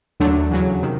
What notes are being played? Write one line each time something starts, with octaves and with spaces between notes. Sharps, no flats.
D#2 D3 F#3 A3 D4
E2 C#3 F#3
C3 D#3